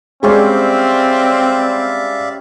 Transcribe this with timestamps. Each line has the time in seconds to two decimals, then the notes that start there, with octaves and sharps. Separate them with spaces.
0.23 G3 G#3 C4 C#4 C5 D5 E5 F5